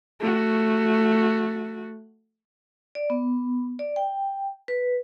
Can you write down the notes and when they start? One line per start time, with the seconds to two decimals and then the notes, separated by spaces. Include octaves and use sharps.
0.21 A3 F#4
2.95 D5
3.10 B3
3.79 D5
3.96 G5
4.68 B4